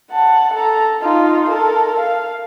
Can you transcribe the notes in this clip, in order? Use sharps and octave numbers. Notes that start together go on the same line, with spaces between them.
F#5 A5
A4 A#5
D#4 F4
A4 A#4
F5